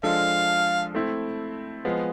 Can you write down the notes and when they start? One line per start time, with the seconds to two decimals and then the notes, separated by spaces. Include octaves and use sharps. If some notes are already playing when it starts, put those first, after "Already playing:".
0.03 F3 G#3 D4 A4 F5
0.95 A3 C4 E4
1.85 F3 G#3 B3